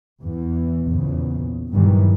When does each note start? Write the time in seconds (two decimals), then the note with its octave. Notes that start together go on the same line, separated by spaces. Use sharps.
0.21 E2 E3
0.88 A#1 E2 C#3
1.72 G2 A#2 D#3 E3 F#3 G3